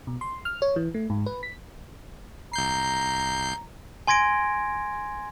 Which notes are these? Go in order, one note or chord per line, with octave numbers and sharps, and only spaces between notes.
B2
C6
F6
C#5
E3
A3
G#2
B4
B6
C2 A#5 G6 C7
G#5 C6 G#6 A#6 D7